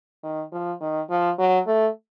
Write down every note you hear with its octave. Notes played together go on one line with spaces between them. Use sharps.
D#3
F3
D#3
F3
F#3
A3